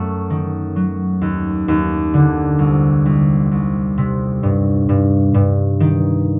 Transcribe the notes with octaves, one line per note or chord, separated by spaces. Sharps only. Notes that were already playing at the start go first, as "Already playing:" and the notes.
Already playing: F#2 A3
D#3
F#3
D#2
D#2
D3
C2
C2
C2
C3
G2
G2
G2
D#3